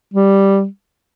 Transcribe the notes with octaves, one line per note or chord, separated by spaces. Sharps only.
G3